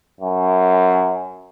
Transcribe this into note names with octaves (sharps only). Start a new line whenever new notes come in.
F#2